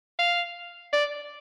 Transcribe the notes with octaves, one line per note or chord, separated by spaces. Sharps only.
F5
D5